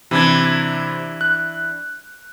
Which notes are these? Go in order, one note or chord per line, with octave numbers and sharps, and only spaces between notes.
C3 E3 D4 B5 G#6
F#6